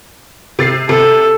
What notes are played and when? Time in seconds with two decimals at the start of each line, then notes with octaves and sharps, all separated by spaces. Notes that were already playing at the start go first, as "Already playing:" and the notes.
0.59 C3 A6 C7
0.89 C3 A4